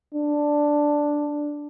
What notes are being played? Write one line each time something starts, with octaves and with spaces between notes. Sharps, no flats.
D4